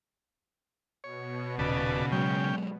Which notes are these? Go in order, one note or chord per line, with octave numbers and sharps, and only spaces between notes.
B2 C#5
D#1 C#3 B4 D5 A5
F#3 G#3 C#4 G5